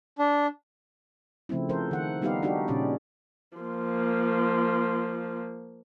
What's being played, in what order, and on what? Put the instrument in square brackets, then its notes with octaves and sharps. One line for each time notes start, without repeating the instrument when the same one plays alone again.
[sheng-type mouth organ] D4
[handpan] C#3 F3 A3 C4 E4
F3 A4 A#4 C5
D#3 F#5
G3 B3 D#4 G4 B4 F5
D4 D#4 F#4 G4
A#2 C#3 C#4 D5
[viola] F3 A#3